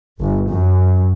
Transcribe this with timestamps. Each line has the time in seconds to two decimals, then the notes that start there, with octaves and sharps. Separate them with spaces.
0.20 G1
0.50 F#2